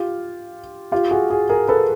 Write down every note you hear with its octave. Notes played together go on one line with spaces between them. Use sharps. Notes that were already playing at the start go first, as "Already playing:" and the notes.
Already playing: F4 G4
F4 G4
F#4 G#4
F#4 G#4
G#4 A#4
A4 B4